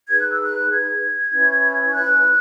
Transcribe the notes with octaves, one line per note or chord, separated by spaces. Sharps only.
D#4 G#4 B4 G#6
F#6
E6
F#6
G#6
C#4 E4 B4
F#6